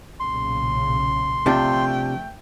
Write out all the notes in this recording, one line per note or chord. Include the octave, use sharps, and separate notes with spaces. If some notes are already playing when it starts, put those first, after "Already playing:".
B1 A#2 C#3 C6
C3 F3 A3 D4 G5